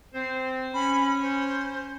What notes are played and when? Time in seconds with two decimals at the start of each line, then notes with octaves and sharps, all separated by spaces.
0.14 C4 C5
0.74 C#4 B5
1.22 C5